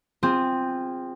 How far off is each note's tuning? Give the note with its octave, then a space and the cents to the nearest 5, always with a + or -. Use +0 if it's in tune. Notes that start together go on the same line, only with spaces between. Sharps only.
C4 +0 F4 +0 G#4 -20